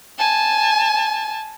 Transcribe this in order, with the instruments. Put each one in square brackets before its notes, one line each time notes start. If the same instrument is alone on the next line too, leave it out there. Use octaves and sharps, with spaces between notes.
[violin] G#5 A5